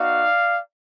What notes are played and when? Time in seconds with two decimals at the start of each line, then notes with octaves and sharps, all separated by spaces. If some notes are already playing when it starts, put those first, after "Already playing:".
Already playing: B3 D#4 F#4 D5 F5